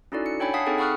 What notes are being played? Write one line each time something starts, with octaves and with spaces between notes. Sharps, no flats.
C#4 D#4 E4 F#4 A4 D5
C#7
D4 C#5 G5 G#5 B5
F5 F#5 A5 D#6 B6 C7
C4 D#4 G#4 A4 G5
F#5 B5 C#6 D#6 F6 F#6